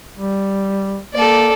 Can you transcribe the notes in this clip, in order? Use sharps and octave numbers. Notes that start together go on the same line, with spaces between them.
G3
A#3 A4 D5